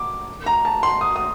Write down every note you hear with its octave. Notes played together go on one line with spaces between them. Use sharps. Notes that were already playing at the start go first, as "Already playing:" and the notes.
Already playing: D6
A#5
A5
C6
D#6
D#6